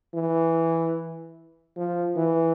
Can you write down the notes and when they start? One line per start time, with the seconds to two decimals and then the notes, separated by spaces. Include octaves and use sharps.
0.14 E3
1.76 F3
2.16 E3